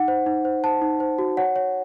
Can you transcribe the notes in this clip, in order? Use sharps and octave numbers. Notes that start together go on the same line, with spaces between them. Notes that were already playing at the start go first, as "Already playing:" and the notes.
Already playing: D#4 F#5
C5
D#4
C5
C5 A5
D#4
C5
F#4
C#5 F#5
C#5